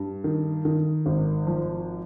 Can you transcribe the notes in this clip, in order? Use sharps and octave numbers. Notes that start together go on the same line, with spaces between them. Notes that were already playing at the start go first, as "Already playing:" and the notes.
Already playing: G2
D#3
D#3
G#1
F3